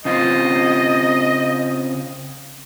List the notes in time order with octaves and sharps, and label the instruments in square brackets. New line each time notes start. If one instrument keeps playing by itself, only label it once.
[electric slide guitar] C#3 C4 F4 [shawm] D#5